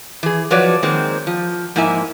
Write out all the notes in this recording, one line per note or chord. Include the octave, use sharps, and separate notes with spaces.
E3 G#4
F3 F#3 B4 C#5 D5
D#3 G#3 A#3 C4
F3
G#2 F3 A#3 E4 E5 G#5